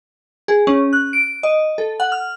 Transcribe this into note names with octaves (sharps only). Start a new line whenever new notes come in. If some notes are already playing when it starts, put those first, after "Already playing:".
G#4
C#4
F#6
D7
D#5
A4
F#5
F6